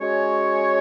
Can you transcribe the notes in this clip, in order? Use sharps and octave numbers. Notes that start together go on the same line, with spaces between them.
G#3 C#4 F#4 C#5